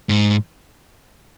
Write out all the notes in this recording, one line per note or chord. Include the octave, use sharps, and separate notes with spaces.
G#2